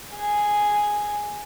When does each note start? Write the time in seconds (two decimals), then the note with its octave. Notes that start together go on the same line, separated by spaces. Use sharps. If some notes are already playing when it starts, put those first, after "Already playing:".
0.14 G#4